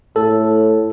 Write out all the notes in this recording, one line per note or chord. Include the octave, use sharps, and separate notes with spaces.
A2 A4